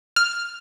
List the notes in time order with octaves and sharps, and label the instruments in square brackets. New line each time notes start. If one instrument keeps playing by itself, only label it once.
[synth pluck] F6